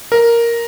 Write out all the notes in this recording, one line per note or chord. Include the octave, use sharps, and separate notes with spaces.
A#4